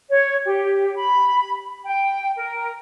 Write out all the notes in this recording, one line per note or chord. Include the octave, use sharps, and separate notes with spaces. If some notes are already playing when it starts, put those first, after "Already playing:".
C#5
G4
B5
G5
A#4